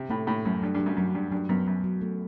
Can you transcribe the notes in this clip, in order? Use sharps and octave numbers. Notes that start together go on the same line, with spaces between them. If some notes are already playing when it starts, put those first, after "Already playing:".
Already playing: C3
A2 A3
A2 A3
F#2 A3
G2 F#3
G2
F#3
F#2
F#2 F#3
G2 F#3
G2 F#3
F#2 B3
F#2 B3
F#3
A3